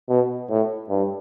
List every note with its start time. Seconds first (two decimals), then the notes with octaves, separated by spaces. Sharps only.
0.09 B2
0.49 A2
0.89 G2